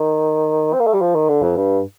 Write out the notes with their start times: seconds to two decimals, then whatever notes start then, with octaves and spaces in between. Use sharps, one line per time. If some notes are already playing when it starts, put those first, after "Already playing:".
Already playing: D#3
0.73 C4
0.80 A#3
0.87 A3
0.93 G3
1.01 F3
1.15 D#3
1.29 D3
1.42 F2
1.56 G2